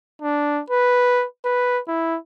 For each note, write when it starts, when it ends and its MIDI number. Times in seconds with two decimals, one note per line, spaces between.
0.22 0.62 62
0.70 1.25 71
1.45 1.80 71
1.88 2.17 64